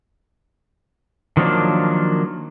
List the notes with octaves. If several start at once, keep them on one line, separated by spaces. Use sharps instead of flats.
D#3 F3 F#3 A#3 D4